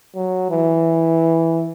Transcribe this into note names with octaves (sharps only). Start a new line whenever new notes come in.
F#3
E3